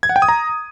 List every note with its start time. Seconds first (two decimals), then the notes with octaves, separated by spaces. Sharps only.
0.03 G#6
0.09 F#5
0.16 G5
0.22 D#6
0.28 A#5